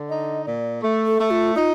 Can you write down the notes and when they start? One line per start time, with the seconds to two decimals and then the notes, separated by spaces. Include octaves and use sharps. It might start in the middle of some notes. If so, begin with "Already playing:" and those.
Already playing: D3
0.09 D#4 D#5
0.46 A#2 D5
0.82 A3
1.07 A4
1.19 A3
1.31 F4
1.55 D#4 F4